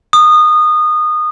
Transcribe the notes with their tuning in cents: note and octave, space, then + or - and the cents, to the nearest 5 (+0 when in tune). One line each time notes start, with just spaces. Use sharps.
D#6 -20